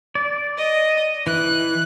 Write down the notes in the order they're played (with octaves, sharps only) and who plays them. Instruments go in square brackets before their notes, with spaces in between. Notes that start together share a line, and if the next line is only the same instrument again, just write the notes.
[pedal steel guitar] D5
[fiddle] D#5
[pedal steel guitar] E3 [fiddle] F#6